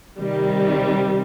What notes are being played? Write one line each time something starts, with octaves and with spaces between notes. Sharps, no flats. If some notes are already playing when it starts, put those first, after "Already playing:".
C3 D#3 G3